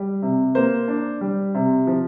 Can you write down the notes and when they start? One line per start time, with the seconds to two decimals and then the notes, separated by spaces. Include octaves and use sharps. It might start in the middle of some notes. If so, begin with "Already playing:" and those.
Already playing: G3
0.22 C3
0.55 A#3 C5
0.88 D4
1.21 G3
1.54 C3
1.87 F3